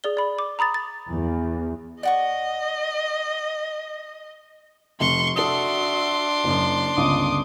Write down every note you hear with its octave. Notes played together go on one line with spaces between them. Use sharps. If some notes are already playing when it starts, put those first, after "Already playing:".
G#4 D5 G7
D5 B5
D6
A#5 B5 D#6 A6
A6
E2
D5 D#5 F#5 C#6
F1 C6 C#6
D4 F#4 A4 E5 C6 D#6
F#1 F#2
G1 C#2 C#3 D6 D#6